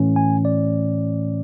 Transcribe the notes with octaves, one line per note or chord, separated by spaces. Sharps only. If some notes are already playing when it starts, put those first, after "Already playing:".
Already playing: A2 E3 A3 C#4
G#5
D5